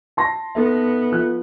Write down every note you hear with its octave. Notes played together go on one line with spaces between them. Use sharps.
A5 C6 A#6
B3 D#4 A4 E5
F3 F#6